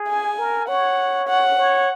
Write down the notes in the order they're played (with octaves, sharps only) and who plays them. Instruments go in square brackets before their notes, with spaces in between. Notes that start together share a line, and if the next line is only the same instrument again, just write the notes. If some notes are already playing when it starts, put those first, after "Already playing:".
Already playing: [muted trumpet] G#4
[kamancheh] G#5
[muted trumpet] A#4
[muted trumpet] C#5 [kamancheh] F#5
[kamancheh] F#5
[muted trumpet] C#5